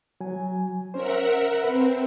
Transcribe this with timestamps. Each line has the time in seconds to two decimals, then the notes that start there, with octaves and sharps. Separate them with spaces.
0.21 F#3 G#5
0.94 C#4 A#4 C5 E5 F#5
1.64 C4 B4